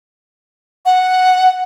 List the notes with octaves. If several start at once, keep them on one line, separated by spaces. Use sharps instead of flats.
F#5